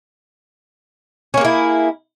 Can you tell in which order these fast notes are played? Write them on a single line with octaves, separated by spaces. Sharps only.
C#4 A#3 G#4 E4